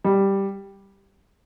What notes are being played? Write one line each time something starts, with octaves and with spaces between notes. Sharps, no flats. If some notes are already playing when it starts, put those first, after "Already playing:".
G3